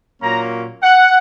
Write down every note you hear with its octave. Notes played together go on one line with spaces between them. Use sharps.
A#2 F#3 A#3 C#4 A#5
F#5